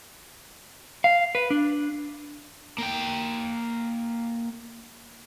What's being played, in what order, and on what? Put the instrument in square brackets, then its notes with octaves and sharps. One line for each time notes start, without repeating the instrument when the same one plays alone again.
[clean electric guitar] F5
B4
D4
[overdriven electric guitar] A#3 G5